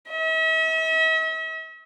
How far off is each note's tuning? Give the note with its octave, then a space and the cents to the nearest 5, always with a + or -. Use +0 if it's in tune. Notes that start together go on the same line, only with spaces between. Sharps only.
E5 -45